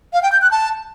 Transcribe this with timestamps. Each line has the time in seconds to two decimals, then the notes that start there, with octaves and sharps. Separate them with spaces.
0.13 F5
0.23 G5
0.32 G6
0.42 F#6
0.51 A5